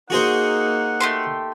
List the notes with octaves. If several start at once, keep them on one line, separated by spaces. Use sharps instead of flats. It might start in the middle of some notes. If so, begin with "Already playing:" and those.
A#3 D#4 F#4 G#4 C5 F#5
A3 G4 C6